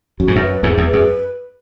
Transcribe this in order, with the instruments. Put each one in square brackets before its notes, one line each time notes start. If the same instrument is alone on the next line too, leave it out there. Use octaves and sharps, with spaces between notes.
[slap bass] F#2 [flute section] F#4
[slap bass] G#2
F#2
[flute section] B4
[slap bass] E2 G#2 [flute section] G#4
[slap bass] E2
[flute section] B4
[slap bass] F#2